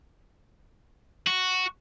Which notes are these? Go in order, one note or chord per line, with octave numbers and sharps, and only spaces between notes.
F#4